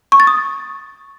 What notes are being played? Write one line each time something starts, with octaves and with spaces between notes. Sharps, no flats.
C#6
A6
D#6